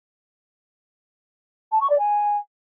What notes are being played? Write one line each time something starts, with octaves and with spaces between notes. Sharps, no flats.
A5
C#6
D5
G#5